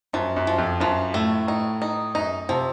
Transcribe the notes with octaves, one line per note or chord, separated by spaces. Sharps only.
F#2 F3
F#2
F3
F2
F#2 F3
A2 A3
A2 D#4
D#4
F#2 D#4
C3 F3